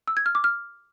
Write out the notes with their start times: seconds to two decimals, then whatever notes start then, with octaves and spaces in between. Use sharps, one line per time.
0.08 E6
0.17 G#6
0.26 F6
0.35 D6
0.44 F6